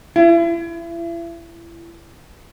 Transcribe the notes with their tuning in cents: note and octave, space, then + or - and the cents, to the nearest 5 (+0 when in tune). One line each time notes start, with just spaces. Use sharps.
E4 +35